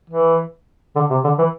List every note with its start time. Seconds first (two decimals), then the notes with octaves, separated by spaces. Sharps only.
0.10 E3
0.96 D3
1.10 C3
1.24 D3
1.39 E3